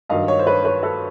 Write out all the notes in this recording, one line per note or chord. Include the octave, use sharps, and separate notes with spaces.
G2 D#3 F#3 D#5 F5
C#5 D#5
C5
B4 C#5
B4 C#5
A4 B4